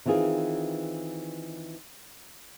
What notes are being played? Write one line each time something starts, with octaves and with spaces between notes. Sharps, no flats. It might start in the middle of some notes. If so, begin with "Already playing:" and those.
D#3 E3 C4 F4 G#4